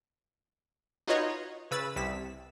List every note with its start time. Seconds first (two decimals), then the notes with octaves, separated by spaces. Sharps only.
1.08 D#4 F4 F#4 B4 C#5 D#5
1.71 C#3 B4 E6 A6
1.96 C2 B6 E7